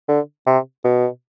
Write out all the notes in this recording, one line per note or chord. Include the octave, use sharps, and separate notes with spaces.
D3
C3
B2